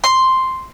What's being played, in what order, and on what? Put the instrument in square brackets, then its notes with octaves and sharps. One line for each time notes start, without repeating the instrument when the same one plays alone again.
[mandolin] C6